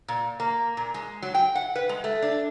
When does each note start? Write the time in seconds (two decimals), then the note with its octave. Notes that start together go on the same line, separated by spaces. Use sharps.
0.08 A#2
0.40 A#3
0.77 A#2
0.94 G#3
1.22 F#3
1.34 G5
1.55 F#5
1.76 B4
1.89 G#3
2.04 A3
2.22 D4